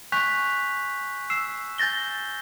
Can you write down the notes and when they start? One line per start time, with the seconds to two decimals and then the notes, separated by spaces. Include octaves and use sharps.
0.12 G#5 C#6 F#6 G6 B6 F7
0.32 F#6
1.30 E6 C7 E7
1.78 G#5 G6 A6 A#6 G7